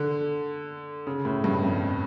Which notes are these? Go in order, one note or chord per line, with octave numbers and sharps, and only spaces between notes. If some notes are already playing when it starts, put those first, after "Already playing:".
Already playing: D3
C#3
A2
G2
F2